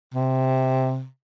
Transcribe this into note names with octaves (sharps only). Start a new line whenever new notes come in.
C3